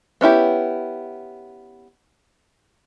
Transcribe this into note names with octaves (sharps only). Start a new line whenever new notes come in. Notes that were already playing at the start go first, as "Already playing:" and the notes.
B3 C#4 E4 G4